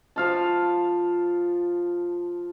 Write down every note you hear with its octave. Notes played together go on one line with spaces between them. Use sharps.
F3 F5 A5